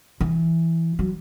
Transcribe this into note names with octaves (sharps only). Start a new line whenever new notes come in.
E3
F#3